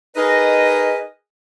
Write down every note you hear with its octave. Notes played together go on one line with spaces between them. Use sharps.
D#4 G#4 A#4 B4 D#5